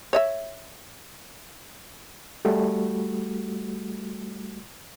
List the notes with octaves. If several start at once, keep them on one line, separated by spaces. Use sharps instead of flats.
C#5 D#5 E5
G3 A3 F#4